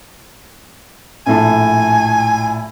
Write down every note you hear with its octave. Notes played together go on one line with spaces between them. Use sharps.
A#1 A2 G#5 A5